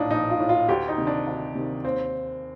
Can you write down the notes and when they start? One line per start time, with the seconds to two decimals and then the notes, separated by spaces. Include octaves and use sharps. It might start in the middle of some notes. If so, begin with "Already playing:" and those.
Already playing: A#1 A2 D4 D#4 F4
0.10 A#1 D#4
0.30 F4
0.40 A2
0.49 F4
0.69 D2 G4
0.88 D#4
0.98 C3 D#3
1.07 D4
1.27 D2
1.55 C3 D#3
1.84 D#2 C4